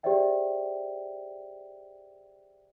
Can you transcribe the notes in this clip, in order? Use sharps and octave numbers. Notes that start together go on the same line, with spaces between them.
G4 G#4 C5 D5 E5 G5